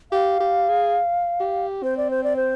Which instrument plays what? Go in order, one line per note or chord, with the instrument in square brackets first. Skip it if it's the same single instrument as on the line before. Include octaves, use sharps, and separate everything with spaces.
[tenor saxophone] G4 [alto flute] F5
[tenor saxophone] G4
G#4
G4
[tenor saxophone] C4 [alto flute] C5
[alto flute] D5
C5
D5
C5